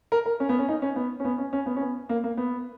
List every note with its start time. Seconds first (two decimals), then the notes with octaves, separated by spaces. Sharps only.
0.12 A#4
0.26 A#4
0.40 C#4
0.49 B3
0.59 C#4
0.68 D#4
0.82 C#4
0.96 B3
1.20 C#4
1.25 B3
1.38 C#4
1.53 C#4
1.66 B3
1.76 C#4
1.81 B3
2.09 A#3
2.24 A#3
2.37 B3